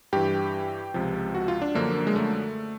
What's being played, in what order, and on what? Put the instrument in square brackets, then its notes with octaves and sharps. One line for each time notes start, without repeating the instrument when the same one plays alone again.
[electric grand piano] G2 E3 G4
C#2 C3 F3
F#4
F4
D4
F#2 D3 F3 A#3
G#3
A3